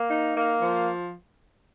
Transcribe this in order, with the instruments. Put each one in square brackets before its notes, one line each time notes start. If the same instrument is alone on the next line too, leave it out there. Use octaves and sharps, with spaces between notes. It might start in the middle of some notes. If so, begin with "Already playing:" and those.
Already playing: [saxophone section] A#3
D#4
A#3
F3